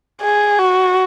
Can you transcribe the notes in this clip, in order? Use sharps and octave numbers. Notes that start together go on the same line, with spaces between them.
G#4
F#4